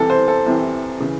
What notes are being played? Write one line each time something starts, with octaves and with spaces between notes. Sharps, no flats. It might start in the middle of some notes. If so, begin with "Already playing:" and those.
Already playing: C2 C3 E3 A4
C5
A4
C2 C3 E3
C#3 E3